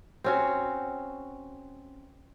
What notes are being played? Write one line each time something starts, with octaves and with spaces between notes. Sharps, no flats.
C4 C#4 F#4